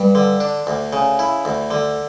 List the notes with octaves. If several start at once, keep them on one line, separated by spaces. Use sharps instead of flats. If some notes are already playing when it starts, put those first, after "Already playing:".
Already playing: G2
D3
D4
D2
C#3
E4
D2
D3